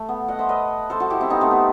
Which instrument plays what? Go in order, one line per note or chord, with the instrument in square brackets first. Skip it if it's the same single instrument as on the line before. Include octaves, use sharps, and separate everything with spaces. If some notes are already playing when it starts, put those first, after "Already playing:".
Already playing: [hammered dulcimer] A3
B3
D#5 F#5
C5 E5
B4 D#5
A4 C5
F#4 A4
E4 G4
C4 E4
B3 D#4
A3 C4
B3